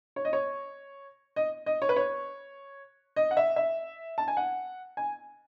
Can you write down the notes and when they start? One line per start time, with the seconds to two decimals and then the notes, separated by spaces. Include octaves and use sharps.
0.16 C#5
0.25 D#5
0.33 C#5
1.36 D#5
1.66 D#5
1.82 C#5
1.89 B4
1.96 C#5
3.16 D#5
3.31 F#5
3.37 E5
3.56 E5
4.18 A5
4.28 G#5
4.37 F#5
4.97 G#5